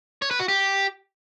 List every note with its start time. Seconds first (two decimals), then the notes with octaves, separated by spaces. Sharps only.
0.22 C#5
0.31 B4
0.40 F#4
0.48 G4